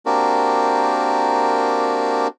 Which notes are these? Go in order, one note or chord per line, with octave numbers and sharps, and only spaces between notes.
A#3 C4 D4 F#4 G4 A#4